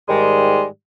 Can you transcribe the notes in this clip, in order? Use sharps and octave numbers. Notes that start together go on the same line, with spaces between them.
G#2 D#3 G3 G#3